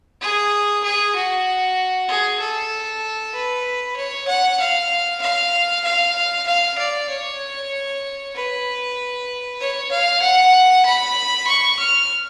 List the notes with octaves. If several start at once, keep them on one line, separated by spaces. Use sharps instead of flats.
G#4
G#4
F#4
G#4
A4
B4
C#5
F#5
F5
F5
F5
F5
D5
C#5
B4
C#5
F5
F#5
B5
C#6
F6